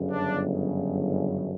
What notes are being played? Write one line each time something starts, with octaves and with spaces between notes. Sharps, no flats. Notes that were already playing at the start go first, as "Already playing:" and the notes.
Already playing: G1 F#2 C#3
D4